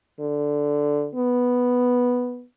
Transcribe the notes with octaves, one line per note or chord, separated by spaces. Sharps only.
D3
B3